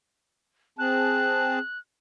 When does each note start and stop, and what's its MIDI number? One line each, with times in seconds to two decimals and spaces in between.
0.79 1.59 60
0.79 1.59 68
0.79 1.59 81
0.79 1.79 90